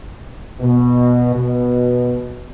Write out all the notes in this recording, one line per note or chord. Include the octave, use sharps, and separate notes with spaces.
B2
B2